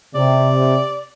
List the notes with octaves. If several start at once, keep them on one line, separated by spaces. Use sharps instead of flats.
C3 D5